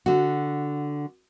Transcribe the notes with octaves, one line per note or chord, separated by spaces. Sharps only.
D3 F#4